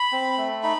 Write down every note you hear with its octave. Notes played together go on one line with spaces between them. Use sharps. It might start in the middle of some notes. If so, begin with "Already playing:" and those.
Already playing: B5
C4
A3
D#4 B5